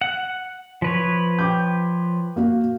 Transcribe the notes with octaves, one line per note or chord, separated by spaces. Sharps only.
F#5
F3 B4 C#5
G5 D6 G6
A#3 F#4 F5